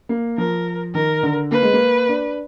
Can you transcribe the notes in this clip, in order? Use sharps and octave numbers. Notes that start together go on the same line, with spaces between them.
A#3
F3 A#4
D#3 A#4
D3
A#3 B4
G#3
A#3
D4